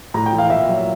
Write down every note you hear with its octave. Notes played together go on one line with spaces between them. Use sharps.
A2 A#5
G5
E3
F5
A#2 E5
F#3